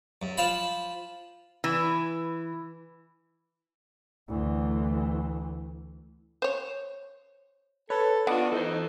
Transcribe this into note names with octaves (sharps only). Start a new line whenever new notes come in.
F#2
F3 F5 A5 B5
E3
D2 E3
C5 C#5
A4 B4 C#5
B3 D4 F4 D#5 F#5 D6
E3 D#4 A4 C5